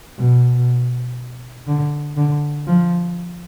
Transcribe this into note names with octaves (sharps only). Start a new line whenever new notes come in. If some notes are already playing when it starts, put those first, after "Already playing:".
B2
D3
D3
F3